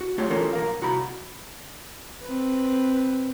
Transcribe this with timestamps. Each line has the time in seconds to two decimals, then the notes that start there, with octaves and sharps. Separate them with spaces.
0.01 F#4
0.18 A3 F4 G4 C#5
0.30 E3 C#4 F4 A4 A#4
0.53 B1 A#4 F5
0.81 C2 F#4 A#5 B5
2.24 C4 B4